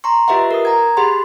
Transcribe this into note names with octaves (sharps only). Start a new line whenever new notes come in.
A#5 C6 C#6
F4 G4 B4 D#5 E5 F#5
A#4 D#6
A#5 G#6
G4 G#4 F#5 B5 C6